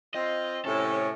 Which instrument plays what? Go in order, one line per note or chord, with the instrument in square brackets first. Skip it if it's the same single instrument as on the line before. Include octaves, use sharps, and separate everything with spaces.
[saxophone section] C4 F4 [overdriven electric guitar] D#5
[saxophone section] A2 C3 [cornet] C#4 [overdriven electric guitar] A4